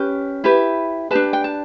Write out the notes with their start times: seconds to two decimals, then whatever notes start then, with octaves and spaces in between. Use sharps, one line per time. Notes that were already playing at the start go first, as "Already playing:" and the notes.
Already playing: C#4 G4 B4
0.44 E4 G4 B4
1.11 D4 G4 B4 A5
1.33 G5
1.44 A5